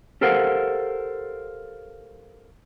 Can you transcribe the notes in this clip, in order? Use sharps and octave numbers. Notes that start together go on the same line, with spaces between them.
G4 A4 A#4 C5 F5 F#5